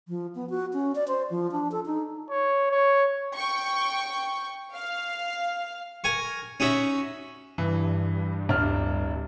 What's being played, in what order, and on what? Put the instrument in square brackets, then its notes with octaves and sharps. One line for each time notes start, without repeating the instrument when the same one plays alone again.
[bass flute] F3
B3
F#4
C#4
D5
C5
F3
D4
A4
D#4
[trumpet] C#5
C#5
[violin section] G5 C#6
F5
[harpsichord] A#4 G#5 C#6
C#4 D#4 F#4 E5
[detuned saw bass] G2 [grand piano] E3
[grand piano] D1 D4 F6